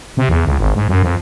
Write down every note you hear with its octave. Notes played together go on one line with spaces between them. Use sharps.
C3
E2
C#2
G#1
G#2
F#2
F2